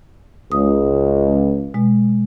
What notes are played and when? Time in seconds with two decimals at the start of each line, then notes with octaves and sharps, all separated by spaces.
0.52 C#2 D#6
1.74 B2 G#3